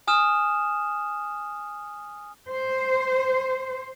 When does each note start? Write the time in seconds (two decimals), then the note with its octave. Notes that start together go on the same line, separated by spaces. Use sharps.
0.07 G#5 D#6 F6 E7
2.49 C5